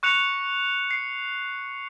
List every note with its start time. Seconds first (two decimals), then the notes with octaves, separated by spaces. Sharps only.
0.03 C#6 F#6 C#7 F7
0.91 C7